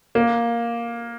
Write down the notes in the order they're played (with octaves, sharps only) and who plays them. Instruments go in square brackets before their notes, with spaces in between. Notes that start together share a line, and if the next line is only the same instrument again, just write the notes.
[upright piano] A#3